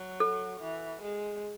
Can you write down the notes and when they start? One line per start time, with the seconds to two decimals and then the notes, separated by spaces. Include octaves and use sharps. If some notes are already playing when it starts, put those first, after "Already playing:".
Already playing: F#3
0.20 A4
0.60 E3
1.02 G#3